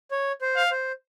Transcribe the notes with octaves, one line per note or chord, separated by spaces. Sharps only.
C#5
C5
F5
C5